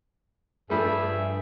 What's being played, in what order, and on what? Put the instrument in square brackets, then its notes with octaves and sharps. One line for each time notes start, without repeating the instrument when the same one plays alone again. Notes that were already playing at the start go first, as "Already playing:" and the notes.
[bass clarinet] G2 [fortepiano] F3 G3 A3 [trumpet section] G#4 E5